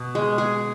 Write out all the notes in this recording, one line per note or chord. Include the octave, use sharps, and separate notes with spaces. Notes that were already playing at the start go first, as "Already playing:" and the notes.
Already playing: B2
G#3
G#4